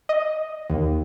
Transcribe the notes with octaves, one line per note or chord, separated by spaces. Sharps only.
D#5
D#2